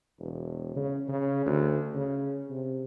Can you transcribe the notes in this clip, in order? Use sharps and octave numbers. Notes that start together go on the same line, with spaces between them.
E1
C#3
C#3
D2
C#3
C3